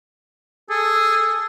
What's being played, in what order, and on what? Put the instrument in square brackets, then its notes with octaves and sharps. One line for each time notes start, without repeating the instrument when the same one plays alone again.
[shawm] G#4 [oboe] A4